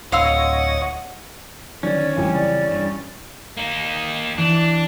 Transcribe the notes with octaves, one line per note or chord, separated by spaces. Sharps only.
D1 C#5 D#5 F5 F#5 C6 E6
D3 D#3 F#3 C#4 D5
G1 F2 A2 E3 F#3 G3 G#5
C#3 D5
G2
A#3 D#4
D#5 G5
E3 D4 E5
E4 D6